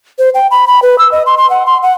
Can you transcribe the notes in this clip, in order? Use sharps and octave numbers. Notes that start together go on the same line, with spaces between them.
C5
G5
B5
B5
B4
E6
D#5
C6
C6
F#5
C6
F#5